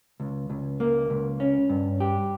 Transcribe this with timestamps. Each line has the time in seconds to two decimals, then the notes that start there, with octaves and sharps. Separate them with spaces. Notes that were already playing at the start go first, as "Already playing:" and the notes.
0.20 C#2
0.50 C#2
0.80 A#3
1.10 C#2
1.40 C#4
1.69 G2
2.00 G4